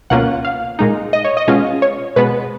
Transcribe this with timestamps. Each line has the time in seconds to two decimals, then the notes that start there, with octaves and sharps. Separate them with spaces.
0.10 C#2 B2 A#3 C#4 F4 F#5
0.45 F5
0.79 A#2 G#3 D#4
1.13 D#5
1.25 C#5
1.37 D#5
1.48 B2 G#3 C#4 F4
1.82 C#5
2.16 B2 G#3 B3 B4